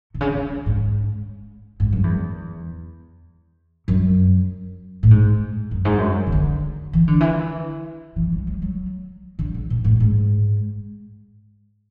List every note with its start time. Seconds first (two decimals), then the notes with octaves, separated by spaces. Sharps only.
0.14 B2
0.21 C#3
0.35 C#3
0.66 G#2
1.80 G#2
1.93 F#2
2.04 E2
3.88 F#2
5.03 A2
5.11 G#2
5.71 F#2
5.85 G#2
5.98 F#2
6.27 C#3
6.32 D3
6.93 E3
7.08 D3
7.20 E3
8.16 E3
8.32 F#3
8.47 G#3
8.62 F#3
9.39 D3
9.54 C#3
9.70 B2
9.84 A2
10.00 G#2